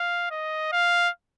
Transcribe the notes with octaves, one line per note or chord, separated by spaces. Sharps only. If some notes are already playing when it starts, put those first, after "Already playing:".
Already playing: F5
D#5
F5